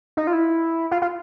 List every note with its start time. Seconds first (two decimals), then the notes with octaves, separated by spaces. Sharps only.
0.17 D#4
0.27 F4
0.33 E4
0.91 F4
1.02 F4